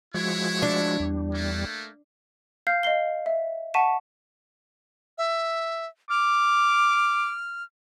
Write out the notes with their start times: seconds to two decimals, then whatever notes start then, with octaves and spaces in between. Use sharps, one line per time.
0.14 F3 G#3 E4 F#4 C#5
0.62 D4
1.00 E2 G3
1.33 A3 A#3
2.67 F5 F6 G6 C7
2.83 D#5 F5 C7 G7
3.26 E5
3.74 F#5 A5 C#6 B6 D#7 E7
5.18 E5
6.10 D6 F6